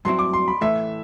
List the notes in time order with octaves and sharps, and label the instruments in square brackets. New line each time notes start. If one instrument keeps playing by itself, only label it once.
[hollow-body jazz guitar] G2 F#3 C4 E4 [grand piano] C6
[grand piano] D6
C6
B5
[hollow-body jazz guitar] A2 E3 A3 [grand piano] E5